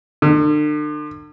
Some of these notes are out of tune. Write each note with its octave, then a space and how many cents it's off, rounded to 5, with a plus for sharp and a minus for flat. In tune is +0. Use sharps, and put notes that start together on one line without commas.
D3 +40